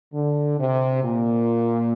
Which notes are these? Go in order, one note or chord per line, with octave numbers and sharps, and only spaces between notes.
D3
C3
A#2